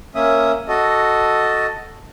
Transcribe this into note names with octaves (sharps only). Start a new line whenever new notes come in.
A#3 C#4 E5 D#6
F#4 A4 D#5